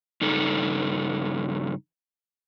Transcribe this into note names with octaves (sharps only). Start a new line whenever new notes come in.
G2 C#3 D#4 A4